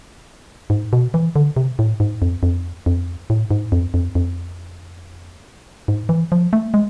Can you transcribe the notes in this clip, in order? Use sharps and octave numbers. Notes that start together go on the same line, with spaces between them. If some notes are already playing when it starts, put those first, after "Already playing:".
G#2
B2
E3
D3
C3
A2
G#2
F2
F2
F2
A2
G#2
F2
F2
F2
G#2
E3
F3
A3
G#3